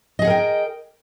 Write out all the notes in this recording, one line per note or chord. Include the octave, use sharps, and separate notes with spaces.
G#4 A#4 D#5 F#5 G5